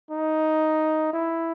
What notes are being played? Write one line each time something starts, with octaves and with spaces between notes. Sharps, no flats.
D#4
E4